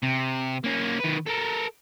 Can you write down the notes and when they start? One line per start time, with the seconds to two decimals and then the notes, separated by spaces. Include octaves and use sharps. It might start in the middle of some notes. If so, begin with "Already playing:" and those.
0.03 C3
0.64 A#3 C#4
1.00 D#3 B4
1.27 A4 A#4